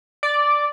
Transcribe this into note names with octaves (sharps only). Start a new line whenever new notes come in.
D5